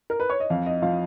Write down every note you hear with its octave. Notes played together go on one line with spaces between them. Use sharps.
A#4
B4
C#5
D#5
F2 F5
D#5
F3 F5